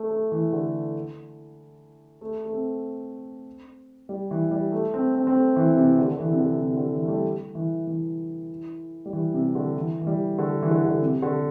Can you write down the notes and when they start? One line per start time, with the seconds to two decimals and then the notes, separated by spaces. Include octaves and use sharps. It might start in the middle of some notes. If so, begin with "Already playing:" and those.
Already playing: A3
0.11 A3
0.32 E3
0.53 D3
2.21 A3
2.45 A3
2.52 C4
4.09 G3
4.31 E3
4.51 G3
4.72 A3
4.94 C4
5.15 C4
5.27 C4
5.35 A3
5.56 E3
5.77 C3
5.99 D3
6.12 D3
6.20 E3
6.33 C3
6.40 D3
6.62 C3
6.77 D3
6.93 E3
7.03 A3
7.08 G3
7.55 E3
7.87 E3
9.06 G3
9.13 E3
9.34 C3
9.55 D3
9.76 E3
10.01 E3
10.07 G3
10.38 D3
10.63 E3
10.71 D3
10.85 D3
11.02 C3
11.22 D3